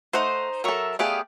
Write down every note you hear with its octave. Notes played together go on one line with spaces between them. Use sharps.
A3 D#4 C5 F#5
F#3 A4 A#4 E5 C#6
A3 B3 G4 G#4 D5 F5